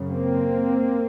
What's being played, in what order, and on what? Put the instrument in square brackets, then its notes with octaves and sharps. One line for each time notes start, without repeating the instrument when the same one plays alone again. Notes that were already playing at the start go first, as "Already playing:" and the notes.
Already playing: [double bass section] F#2 C#3
A#3 C4